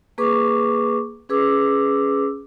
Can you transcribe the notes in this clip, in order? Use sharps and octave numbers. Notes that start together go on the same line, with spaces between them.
A#3 G#4 B4 C#6 D6
C#4 G#4 B4 D6 E6